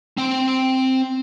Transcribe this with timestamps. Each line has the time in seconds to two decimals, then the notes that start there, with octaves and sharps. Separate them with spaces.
0.17 C4 G5